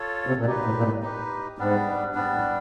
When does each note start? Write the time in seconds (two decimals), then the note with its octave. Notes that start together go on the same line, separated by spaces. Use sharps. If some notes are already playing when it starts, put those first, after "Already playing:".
Already playing: F4 A4 C#5
0.27 C3
0.37 A#2
0.46 B2 D#4 G4 B4
0.65 A2
0.75 A#2
0.83 A2
1.02 D#4 G4 B4
1.58 G#2 G3 B3 D4
2.14 G#2 G3 B3 D4
2.34 A2